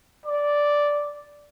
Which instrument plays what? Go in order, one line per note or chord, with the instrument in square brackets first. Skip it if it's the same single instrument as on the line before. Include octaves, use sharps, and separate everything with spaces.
[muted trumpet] D5